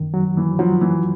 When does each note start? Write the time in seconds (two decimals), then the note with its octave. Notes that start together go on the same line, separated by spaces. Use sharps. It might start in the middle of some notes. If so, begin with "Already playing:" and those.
Already playing: F#2 D#3
0.14 F#3
0.37 E3
0.59 F3 F#3
0.81 E3